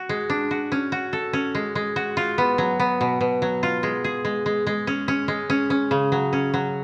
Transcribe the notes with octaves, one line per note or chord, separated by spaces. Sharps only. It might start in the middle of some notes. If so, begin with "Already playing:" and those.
Already playing: F#4
G#3
D4
F#4
C#4
F#4
A4
C#4
G#3
G#3
F#4
F4
B3
F#3
B3
B2
B2
F#3
F4
G#3
G#4
G#3
G#3
G#3
C#4
C#4
G#3
C#4
C#4
C#3
F#3
C#4
F#3